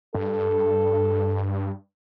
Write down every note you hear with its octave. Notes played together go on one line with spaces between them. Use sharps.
G2 A4